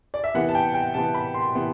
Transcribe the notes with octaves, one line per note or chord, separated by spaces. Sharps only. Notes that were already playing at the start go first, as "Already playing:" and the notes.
D5
E5
C3 E3 B3 F#5
A5
G5
G5
C3 E3 B3 A5
B5
C6
C3 E3 B3